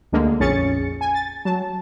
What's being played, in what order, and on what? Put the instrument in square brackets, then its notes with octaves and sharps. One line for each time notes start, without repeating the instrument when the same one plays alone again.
[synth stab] D2 D3 G#3 A#3
A#1 F2 C#4 G#4 A6 C#7
G#5
A6
F#3 A5